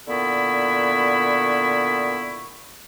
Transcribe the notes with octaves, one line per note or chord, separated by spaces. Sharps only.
A#2 D3 B3 E4 B5 C#6